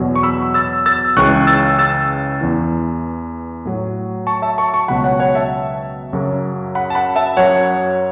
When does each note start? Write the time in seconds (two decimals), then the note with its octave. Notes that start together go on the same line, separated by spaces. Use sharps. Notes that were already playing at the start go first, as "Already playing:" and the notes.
Already playing: E2 B2 F#3
0.16 C#6
0.23 B5 E6
0.54 E6 A6
0.86 E6 A6
1.16 C#2 C#3 E3 C#6 F#6
1.47 E6 A6
1.79 E6 A6
2.41 E2 E3
3.65 A2 F#3
4.27 A5 C#6
4.42 E5 A5
4.58 A5 C#6
4.74 A5 C#6
4.88 C#2 B2 F#3 F#5 B5
5.04 C#5 F#5
5.20 C#5 F#5
5.35 E5 A5
6.13 F#2 C#3 F#3
6.75 F#5 B5
6.90 A5
6.95 F#5 B5
7.16 E5 A5
7.37 F#2 F#3 C#5 F#5